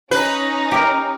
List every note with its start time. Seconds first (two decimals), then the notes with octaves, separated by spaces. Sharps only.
0.11 C#4 D#4 B4
0.71 G4 A#4